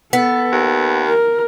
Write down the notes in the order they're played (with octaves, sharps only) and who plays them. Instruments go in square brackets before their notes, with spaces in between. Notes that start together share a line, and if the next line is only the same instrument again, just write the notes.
[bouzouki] B3 [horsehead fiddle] A4
[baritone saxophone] D#2
[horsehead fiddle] A#4